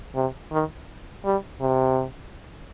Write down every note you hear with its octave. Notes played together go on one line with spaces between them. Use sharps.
C3
D#3
G3
C3